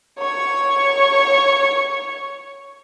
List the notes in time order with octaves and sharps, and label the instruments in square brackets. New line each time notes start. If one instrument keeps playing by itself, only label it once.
[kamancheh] C#5 C#6